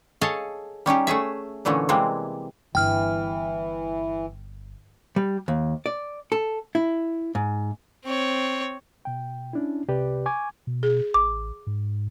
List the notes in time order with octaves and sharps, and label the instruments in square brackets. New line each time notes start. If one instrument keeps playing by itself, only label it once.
[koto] G#4 A4 C#5 D#5 F5 A5
G3 C#4 D#4 G4
A3 C#4 G#4 E5
A#2 D3 E3 A3 C#4
C3 E3 G3 G#3 A#3 C4
[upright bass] G1 [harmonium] E3 [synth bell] G5 F6
[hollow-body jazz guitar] G3
D#2
D5
A4
E4
G#2
[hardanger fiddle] C4 C#5
[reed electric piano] B2 G5
C#4 D4 E4
C2 C3 G4 B4 D5
G#5 C#6 D6 G#6
[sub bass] B2
[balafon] G#4
[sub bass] A1 [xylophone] D6
[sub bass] G#2